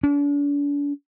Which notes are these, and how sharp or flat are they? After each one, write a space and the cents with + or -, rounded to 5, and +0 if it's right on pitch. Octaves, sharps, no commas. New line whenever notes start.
D4 -40